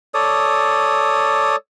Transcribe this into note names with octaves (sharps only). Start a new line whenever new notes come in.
A4 C#5 D5 D#6